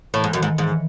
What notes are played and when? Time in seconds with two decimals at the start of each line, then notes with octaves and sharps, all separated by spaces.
0.14 A2 E3
0.24 G#2
0.33 F#2 D#3
0.42 G#2
0.58 G#2 E3